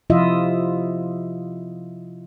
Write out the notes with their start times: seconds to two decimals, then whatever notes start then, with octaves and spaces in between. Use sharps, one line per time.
0.10 C3 F3 E4 F4 D#5 E5